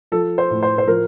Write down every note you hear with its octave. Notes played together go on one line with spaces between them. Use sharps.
F3 A4
C5
A2
C5
C5
F3 A#4